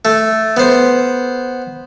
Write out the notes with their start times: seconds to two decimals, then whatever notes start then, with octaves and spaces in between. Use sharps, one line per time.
0.05 A3
0.57 B3 C5